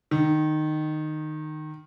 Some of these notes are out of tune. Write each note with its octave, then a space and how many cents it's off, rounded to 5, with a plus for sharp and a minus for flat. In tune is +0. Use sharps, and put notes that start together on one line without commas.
D#3 -15